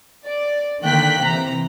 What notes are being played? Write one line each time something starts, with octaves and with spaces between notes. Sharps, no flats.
D5
D3 D#3 A#3 G5 F#6 B6
C3 E3 A#5